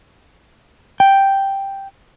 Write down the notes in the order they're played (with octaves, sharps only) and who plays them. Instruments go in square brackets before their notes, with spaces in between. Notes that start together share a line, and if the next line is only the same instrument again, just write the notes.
[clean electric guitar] G5